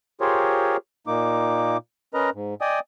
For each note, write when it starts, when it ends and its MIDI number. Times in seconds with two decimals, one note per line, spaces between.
0.21 0.77 65
0.21 0.77 67
0.21 0.77 68
0.21 0.77 70
0.21 0.77 72
0.21 0.77 73
1.07 1.77 46
1.07 1.77 58
1.07 1.77 63
1.07 1.77 86
2.14 2.30 61
2.14 2.30 70
2.14 2.30 71
2.14 2.30 75
2.14 2.30 82
2.34 2.55 44
2.61 2.80 74
2.61 2.80 75
2.61 2.80 79
2.61 2.80 80
2.61 2.80 87